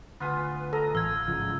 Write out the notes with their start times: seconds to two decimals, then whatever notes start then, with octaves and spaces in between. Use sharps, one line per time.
0.20 D2 B3 F4 B4 G#5
0.73 A4 D#5 A#5
0.95 A1 F5 E6 G#6
1.27 G#2 C#3 F3